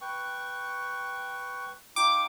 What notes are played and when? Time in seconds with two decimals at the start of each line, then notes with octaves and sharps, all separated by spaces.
0.01 B4 G5 C#6
1.96 D#4 F4 G5 D6